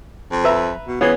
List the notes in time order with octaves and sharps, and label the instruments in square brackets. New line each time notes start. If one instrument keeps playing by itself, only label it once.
[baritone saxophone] F2
[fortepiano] B4 E5 A#5
[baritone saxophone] B2
[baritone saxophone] E3 [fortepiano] B3 C#4 G#4